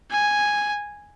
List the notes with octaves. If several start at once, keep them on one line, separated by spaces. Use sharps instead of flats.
G#5